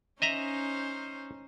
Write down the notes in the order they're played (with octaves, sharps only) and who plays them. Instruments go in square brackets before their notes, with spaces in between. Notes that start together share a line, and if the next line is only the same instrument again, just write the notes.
[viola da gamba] C#4 D#4 C5 [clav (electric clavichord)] D#5 E5 A#5